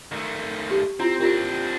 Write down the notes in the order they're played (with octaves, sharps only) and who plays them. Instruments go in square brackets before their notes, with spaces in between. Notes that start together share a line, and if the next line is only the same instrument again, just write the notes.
[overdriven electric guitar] D#3 A3
[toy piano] G4
[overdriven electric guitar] C4 [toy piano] E4 F4
[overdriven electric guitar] C4 D4 [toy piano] F4 G4 A#4